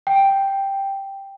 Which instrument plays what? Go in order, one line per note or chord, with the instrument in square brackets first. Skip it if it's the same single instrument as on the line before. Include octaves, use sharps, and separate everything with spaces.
[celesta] G5